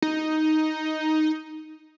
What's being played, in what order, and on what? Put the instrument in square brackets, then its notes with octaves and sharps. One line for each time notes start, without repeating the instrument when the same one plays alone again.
[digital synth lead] D#4